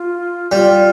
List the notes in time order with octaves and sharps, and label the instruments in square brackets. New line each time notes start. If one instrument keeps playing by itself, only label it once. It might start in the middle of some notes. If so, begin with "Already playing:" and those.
Already playing: [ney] F4
[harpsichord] G3 [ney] F4